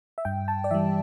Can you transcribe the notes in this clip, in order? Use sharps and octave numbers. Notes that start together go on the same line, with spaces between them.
E5
G2 G5
A5
D5
E3 G3 E5